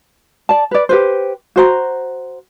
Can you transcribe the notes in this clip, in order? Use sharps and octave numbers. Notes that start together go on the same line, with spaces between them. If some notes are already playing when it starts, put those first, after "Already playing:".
D5 A5
B4 D5
G4 B4 C5
F#4 C5 A#5